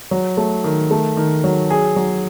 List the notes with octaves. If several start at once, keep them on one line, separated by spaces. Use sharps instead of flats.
F#3
A3
D#3
A3
D#3
F#3
G#4
F#3